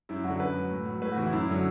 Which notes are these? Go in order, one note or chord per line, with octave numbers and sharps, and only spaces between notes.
F#2 E4
D3 F#3 F#4
F#2 B4
F#3
A2
F#3
A2 B4
F#4
E3 E4
F#2 E4
D3 F#3